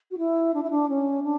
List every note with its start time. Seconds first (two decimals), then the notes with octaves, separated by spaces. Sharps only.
0.11 F#4
0.18 E4
0.54 D4
0.62 E4
0.70 D4
0.89 C#4
1.23 D4